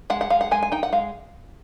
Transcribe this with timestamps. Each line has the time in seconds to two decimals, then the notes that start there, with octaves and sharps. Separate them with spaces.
0.10 G#3 F#5
0.21 F#5
0.30 G#3 F5
0.41 F#5
0.51 G#3 G#5
0.63 G#5
0.72 D#4 G5
0.83 F#5
0.92 G#3 F5